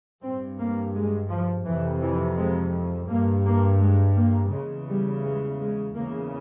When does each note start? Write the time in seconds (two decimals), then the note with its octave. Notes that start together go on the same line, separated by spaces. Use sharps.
0.22 G2 C4
0.59 A#3
0.94 G#3
1.30 F3
1.66 F2 C3 E3
2.01 E3
2.37 G#3
3.09 G2 A#3
3.45 A#3
3.80 G#3
4.17 A#3
4.52 E2 C#3 G#3
4.88 G3
5.24 G#3
5.60 G#3
5.95 E2 C#3 A#3